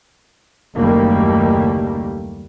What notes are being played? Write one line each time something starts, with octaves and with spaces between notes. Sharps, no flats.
F#1 D#2 G3 A3 A#3